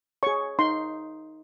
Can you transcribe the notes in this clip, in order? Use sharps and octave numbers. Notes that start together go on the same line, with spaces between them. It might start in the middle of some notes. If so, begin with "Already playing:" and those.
G#4 C#5 C#6
D#4 C6